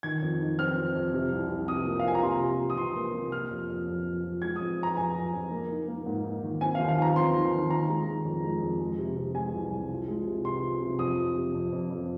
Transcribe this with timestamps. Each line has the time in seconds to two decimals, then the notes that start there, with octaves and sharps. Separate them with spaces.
0.03 D#3 G#6
0.22 F2
0.40 D#4
0.59 C4 F6
0.77 C4
0.95 F2
1.13 C3
1.32 C2
1.49 C3
1.68 C3 D#6
1.86 A#3
1.99 F5
2.05 F3 G#5
2.15 A#5
2.23 C3 C6
2.41 C3
2.59 C3
2.70 D#6
2.77 C3 C6
2.96 A#3
3.14 C3
3.32 F3 F6
3.51 F2
3.69 F2
3.87 F2
4.06 F2
4.24 F3
4.42 G#3 G#6
4.56 D#6
4.60 F2
4.79 F3 A#5
4.97 F2 G#5
5.15 F3
5.33 F2
5.51 A#3
5.70 D#4
5.88 A#3
6.06 G#2
6.24 D#4
6.43 D#3
6.61 C4 G#5
6.75 F5
6.79 D#2
6.88 F5
6.97 D#3 A#5
7.16 C4 C6
7.34 D#3
7.52 D#3
7.70 D#3 A#5
7.89 G#3
8.08 D#3
8.25 F2
8.44 G#3
8.62 F2
8.80 G#3
8.99 C3
9.17 C3
9.35 G#3 G#5
9.54 C2
9.72 C2
9.89 F4
10.08 G#3
10.26 C3
10.45 C3 C6
10.63 F4
10.81 C3
10.99 F2 D#6
11.17 F3
11.36 C3
11.54 F2
11.72 F2
11.90 F2